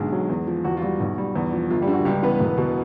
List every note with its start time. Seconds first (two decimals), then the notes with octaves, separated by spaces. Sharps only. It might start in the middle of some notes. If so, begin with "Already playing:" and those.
Already playing: B1 D3 G#3 G#4
0.12 F#3
0.29 E2
0.47 F3
0.64 E2 F#4
0.77 F4
0.82 G3 F#4
1.00 B1
1.18 G3
1.36 E2
1.53 F3
1.70 G1 F4
1.82 G3 G4
1.87 D3
1.94 F#4
2.05 C#2 G3 G4
2.22 E3 B3 B4
2.40 E1
2.58 B2